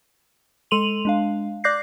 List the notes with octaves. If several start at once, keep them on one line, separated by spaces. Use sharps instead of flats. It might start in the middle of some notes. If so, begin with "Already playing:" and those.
G#3 A4 C6 D#7 F7 F#7
G#3 D4 F5
D5 D6 F#6 G6 A#6 C7